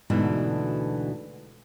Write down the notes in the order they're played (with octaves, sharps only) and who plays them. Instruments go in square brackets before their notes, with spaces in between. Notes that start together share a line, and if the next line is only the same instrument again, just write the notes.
[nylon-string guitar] D2 G#2 B2 D3 E3